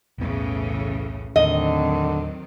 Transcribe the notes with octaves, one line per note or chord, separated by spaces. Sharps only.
B1 E2 A2 C#3 E3 B3
D#2 A2 D3 D#3 F#3 C4 D#5